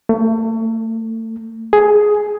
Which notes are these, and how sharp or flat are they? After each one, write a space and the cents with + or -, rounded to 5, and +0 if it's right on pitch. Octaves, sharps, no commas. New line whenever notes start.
A3 +35
G#4 +10